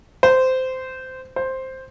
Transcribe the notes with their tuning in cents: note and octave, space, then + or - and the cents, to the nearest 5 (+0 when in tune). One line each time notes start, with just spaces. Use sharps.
C5 -15
C5 +5